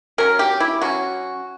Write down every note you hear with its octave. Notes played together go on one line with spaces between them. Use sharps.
F#3 C#4 A#4
G4
E4
F#3 C#4 F#4